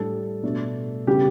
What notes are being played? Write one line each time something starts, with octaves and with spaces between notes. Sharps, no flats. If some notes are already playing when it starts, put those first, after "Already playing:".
Already playing: A2 G3 D4 A4
B2 A3 D4
C#3 G3 B3 G4